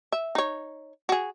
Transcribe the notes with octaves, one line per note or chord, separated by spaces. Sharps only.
E5
D#4 C#5
F#4 G#4